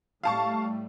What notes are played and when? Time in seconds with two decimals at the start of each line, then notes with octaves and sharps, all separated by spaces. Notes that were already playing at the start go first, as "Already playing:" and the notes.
0.23 A2 G3 A3 F5 A5 C#6